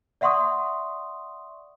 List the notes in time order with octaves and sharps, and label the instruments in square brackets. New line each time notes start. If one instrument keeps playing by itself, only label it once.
[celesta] D5 E5 F#5 C6 C#6 D#6